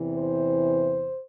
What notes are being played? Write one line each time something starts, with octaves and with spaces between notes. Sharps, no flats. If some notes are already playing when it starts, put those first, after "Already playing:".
Already playing: E2 C3 E3
C5